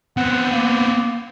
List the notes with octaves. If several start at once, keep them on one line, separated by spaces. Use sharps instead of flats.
B3 C4 F#5
A#3